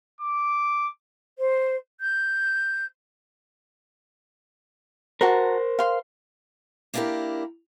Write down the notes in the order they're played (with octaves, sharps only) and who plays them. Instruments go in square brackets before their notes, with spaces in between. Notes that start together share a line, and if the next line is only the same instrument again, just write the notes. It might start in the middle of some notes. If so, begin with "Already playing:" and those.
[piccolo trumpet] D6
[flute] C5
G6
[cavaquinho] F#4 A5 A#5 [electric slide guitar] A#4 C5
[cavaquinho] F5 C6
[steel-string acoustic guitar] A#3 D4 E4 F#4 G4 A#4